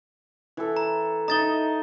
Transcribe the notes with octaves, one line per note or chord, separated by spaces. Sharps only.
E3 A4
A#5
D#4 D#5 A#5 A6 G7